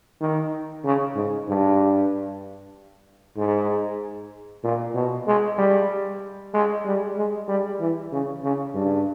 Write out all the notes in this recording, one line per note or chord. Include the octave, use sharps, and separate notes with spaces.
D#3
C#3
G#2
G2
G#2
A#2
B2
G#3
G3
G#3
G3
G#3
G3
E3
C#3
C#3
G2